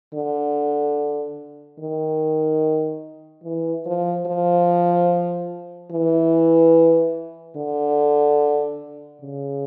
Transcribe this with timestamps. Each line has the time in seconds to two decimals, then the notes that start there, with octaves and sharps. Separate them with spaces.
0.14 D3
1.79 D#3
3.44 E3
3.86 F3
4.26 F3
5.91 E3
7.57 D3
9.22 C#3